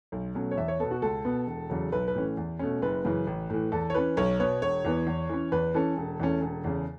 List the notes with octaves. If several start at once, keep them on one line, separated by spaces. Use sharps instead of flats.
B1
B2 F#3 A3 C#4
C#5
E2 E5
C#5
B2 B3 A4
F#4
C#2 A4
B2 B3
E1
E2 C#3 F#3
B1 B4
B4
A2 E3 C#4
E2
B2 A3 C#4
F#1 B4
F#2 C#3 E3
A1
A2 E3
E2 A4
C#5
E3 C#4 B4
B1 C#5
B2 B3 C#5
E1 C#5
E2 E3 B3
E2
E3 C#4
E2 B4
E3 C#4 A4
E1
E2 E3 A3 C#4
E1
E2 C#3